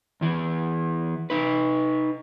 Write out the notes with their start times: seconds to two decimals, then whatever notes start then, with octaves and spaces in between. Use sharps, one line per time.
0.21 E2 E3
1.30 D#4 B4